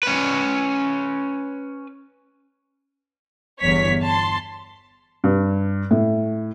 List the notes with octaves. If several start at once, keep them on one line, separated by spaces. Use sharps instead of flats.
C#4 B4
G1 E2 C#5 B6
A5 C6
G2
A2